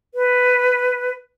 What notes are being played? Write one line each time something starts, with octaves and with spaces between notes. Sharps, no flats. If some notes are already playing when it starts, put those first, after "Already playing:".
B4